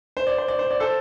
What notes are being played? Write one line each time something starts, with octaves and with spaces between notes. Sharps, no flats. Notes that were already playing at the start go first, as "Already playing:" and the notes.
C5
D5
C5
D5
C5
D5
A4 C5